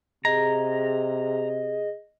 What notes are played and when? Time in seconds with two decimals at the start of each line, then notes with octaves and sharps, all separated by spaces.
0.25 C3 G#4 D#5 A#5